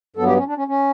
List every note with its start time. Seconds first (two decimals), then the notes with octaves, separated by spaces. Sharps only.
0.16 G2 F#3 B3 A4
0.27 G4
0.37 C#4
0.47 D4
0.57 C#4
0.68 C#4